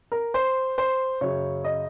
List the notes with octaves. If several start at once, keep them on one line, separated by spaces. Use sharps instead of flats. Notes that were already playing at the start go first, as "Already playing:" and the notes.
A#4
C5
C5
F#2 C#3 C#5
D#5